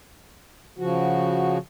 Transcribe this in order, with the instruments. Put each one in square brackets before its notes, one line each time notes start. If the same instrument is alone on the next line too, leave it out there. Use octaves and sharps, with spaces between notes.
[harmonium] C#3 F3 F#4